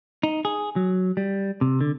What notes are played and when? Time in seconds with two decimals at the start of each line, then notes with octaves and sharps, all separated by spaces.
0.23 D#4
0.45 G#4
0.76 F#3
1.17 G3
1.61 C3
1.81 D3